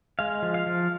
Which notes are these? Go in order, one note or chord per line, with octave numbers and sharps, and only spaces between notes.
G#3 F5
F3
F5
F3